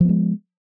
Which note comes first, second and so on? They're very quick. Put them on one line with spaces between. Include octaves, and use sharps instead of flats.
F3 B3 G#3